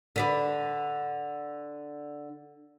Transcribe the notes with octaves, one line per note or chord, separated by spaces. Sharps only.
D3 B4 D5